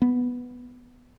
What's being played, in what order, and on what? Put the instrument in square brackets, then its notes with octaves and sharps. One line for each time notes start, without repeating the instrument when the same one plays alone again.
[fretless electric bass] B3